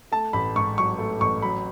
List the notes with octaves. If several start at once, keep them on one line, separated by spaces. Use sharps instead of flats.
A3 A5
A1 B5
G#2 C#6
F#3 C#6
A3
A1 C#6
F#3 B5